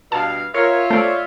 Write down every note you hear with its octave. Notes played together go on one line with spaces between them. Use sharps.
G2 B2 F5 A5
F4 A#4 C#5 E5
A3 C5 D5